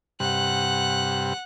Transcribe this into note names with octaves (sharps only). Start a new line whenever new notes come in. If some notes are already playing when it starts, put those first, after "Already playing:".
G2 C3 G3 F#5 F#6